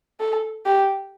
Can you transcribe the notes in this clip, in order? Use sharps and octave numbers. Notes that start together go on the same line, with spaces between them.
A4
G4